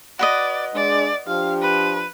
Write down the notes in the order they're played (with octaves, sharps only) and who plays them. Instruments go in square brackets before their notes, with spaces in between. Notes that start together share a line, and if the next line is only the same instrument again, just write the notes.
[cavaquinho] F#4 B4 D#5 [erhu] D5
[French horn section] G#3 D4 [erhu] D5
[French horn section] F3 D4 G4 [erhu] F5
[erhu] B4